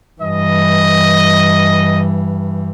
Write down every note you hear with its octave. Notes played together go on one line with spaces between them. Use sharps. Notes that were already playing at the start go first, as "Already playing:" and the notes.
G2 E3 D#5